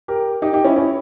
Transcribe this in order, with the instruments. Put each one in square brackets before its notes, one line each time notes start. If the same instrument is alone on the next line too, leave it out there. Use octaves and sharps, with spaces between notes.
[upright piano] G4 A#4
D#4 G4
D#4 G4
C#4 E4
C#4 E4